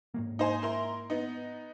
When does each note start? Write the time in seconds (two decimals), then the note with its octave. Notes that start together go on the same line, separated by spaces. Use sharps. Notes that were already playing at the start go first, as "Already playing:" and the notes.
0.14 G#2 G#3 A#3
0.39 D#4 C5 G#5
0.62 E4 A#4 C6
1.10 B3 D#4